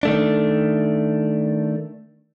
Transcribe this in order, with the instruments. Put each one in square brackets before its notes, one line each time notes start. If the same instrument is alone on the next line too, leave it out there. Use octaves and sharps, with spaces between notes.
[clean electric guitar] D#3 A3 D4